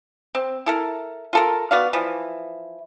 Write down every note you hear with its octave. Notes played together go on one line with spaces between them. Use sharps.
C4
E4 A4 A#4
F4 A4 A#4
B3 F#4 D5 F5
E3 F3